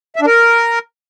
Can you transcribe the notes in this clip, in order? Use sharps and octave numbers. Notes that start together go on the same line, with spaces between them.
E5
D4
A#4